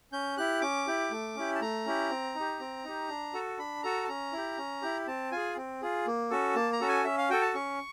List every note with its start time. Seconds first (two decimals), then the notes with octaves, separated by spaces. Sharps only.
0.13 C#4 G6
0.37 E4 G4 F#6
0.61 C#4 D6
0.87 E4 G4
1.11 A3
1.36 C#4 E4 G4
1.55 A5
1.61 A3 A#5
1.86 C#4 E4 G4
2.10 C4
2.35 D#4 G4
2.60 C4
2.84 D#4 G4
3.09 D4
3.33 F#4 A4
3.58 D4 B5
3.83 F#4 A4 A#5
4.04 A5
4.08 C#4 A#5
4.33 E4 G4
4.58 C#4
4.82 E4 G4
5.07 C4 A5
5.31 F4 G#4 G#5
5.57 C4
5.82 F4 G#4
6.07 A#3
6.30 C#4 F#4 A4
6.55 A#3 A5
6.73 A#5
6.81 C#4 F#4 A4
6.89 G#5
7.04 C#4 E5
7.18 F5
7.30 F#4 A4 G5
7.41 A5
7.55 C#4 C#6